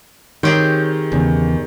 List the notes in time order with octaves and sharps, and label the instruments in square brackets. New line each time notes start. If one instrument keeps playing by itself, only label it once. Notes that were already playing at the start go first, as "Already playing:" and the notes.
[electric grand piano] D#3 [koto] C4 G4 G#4 [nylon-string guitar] C#5
[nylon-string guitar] E2 [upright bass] C#3